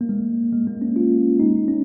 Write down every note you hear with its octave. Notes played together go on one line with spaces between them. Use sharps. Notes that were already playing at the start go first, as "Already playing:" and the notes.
A#3
G#3
G#3
A#3
C#4
F4
D#4
C#4